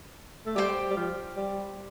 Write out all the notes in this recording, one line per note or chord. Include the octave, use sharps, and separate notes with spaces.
A3
G3 G4 C5 G5
G3
F3
G3